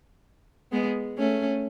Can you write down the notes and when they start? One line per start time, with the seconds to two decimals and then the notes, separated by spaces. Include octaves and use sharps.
0.72 G#3 B3
1.18 A3 C#4